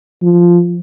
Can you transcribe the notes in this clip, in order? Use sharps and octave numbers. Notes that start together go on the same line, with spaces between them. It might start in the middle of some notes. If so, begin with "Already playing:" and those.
F3